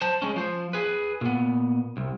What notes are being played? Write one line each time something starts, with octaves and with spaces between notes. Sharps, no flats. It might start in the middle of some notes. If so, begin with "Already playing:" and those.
C5 A5
G#3 C#4
F3 C5
G#4 B4
A#2 B3
C2